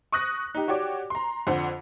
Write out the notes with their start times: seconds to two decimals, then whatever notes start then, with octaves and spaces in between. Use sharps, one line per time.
0.12 C#6 D#6 F#6 A#6
0.55 D#4 G4
0.68 F#4 G4 C#5 D5 D6
1.10 A#5 C6
1.47 F2 D3 C5 F#5